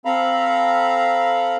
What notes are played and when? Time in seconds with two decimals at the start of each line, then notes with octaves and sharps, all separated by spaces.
0.05 C4 A4 F5 A#5 B5